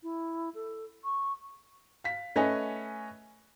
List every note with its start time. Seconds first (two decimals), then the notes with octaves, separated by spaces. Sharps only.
0.03 E4
0.55 A4
1.04 C#6
2.04 F5 B6
2.36 A3 C#4 B4 D#5 G#5